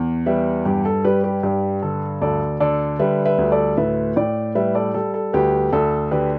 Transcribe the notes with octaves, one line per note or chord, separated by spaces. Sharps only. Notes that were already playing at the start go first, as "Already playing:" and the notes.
Already playing: E2
G3 B4 E5
G2 G4
A4
G3 G4 B4
G4 B4
G2 G4
D3 A4
D2 A4 D5
D3 A4 D5
G3 B4 E5
B4 E5
D2
A4 D5
A2 B4 E5
A2 D5 G5
G3 B4 E5
A4 D5
G3 A4
A4
D2 G4 B4
D2 A4 D5
D3 G4 B4